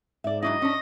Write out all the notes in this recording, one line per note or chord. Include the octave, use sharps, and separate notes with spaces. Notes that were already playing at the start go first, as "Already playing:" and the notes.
G#2 D5 E5
F#3 D4 E4 D#5
C#4 D4 A#6